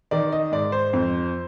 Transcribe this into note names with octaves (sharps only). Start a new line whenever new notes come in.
D#3 D5
D#5
G#2 D5
C5
F2